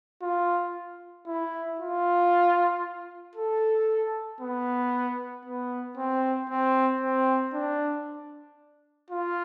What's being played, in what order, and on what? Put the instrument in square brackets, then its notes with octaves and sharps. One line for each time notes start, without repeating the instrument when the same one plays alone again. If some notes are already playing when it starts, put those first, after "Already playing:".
[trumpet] F4
E4
F4
A4
B3
B3
C4
C4
C4
D4
F4